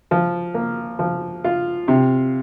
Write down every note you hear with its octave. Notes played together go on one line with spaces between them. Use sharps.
F3
A#3
F3
F4
C3